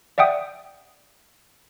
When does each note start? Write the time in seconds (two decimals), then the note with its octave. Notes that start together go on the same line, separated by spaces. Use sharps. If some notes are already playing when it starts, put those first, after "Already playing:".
0.18 D5 E5 F#5 G5 D#6